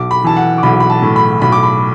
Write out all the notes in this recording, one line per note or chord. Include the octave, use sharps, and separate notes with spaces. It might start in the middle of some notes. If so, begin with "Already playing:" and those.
Already playing: B1 D6
B5
E3 A5
F#5
D6
B1 B5
B5
A5
A2
B5
B1 B5
D6
B5